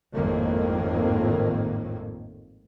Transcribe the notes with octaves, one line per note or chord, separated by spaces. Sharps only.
G#1 F2 A2 D#3 A#3